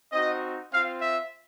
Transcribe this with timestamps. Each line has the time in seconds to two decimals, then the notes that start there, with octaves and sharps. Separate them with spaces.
0.11 C4 D#4 F#4 D#5
0.71 C4 F4 F5
1.01 E5